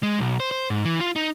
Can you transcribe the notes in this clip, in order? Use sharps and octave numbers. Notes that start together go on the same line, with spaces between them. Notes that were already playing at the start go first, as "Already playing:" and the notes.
G#3
B1
C5
C5
G#2
E3
F4
D#4